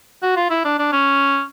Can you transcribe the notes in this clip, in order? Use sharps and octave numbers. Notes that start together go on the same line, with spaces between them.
F#4
F4
E4
D4
D4
C#4